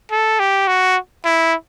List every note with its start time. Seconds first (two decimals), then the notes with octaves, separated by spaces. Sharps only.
0.11 A4
0.39 G4
0.67 F#4
1.25 E4